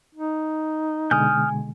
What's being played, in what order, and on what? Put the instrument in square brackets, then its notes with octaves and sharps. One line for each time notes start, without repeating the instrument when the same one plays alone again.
[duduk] D#4
[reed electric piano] B2 D3 G#3 [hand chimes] G#5 [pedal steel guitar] D#6 F6 G6